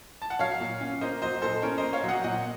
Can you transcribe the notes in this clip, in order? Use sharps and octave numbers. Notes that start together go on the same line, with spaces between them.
A5
F#5
F#3 C#5 F5
A#2
C#4
A#3 C5 D#5
F#3 C5 D#5
A#2 A4 C5
C#4 A#4 C#5
C5 D#5
A#3
C#5 F5
F#3
D#5 F#5
A#2 D#5 F#5